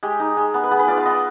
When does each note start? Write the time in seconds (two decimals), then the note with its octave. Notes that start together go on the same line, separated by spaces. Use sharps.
0.03 G#3 G4
0.20 D#4
0.37 G#3
0.54 B3
0.64 B4
0.71 B3 G#4
0.79 B4
0.88 F4 D5
0.97 F5
1.05 B3 D#5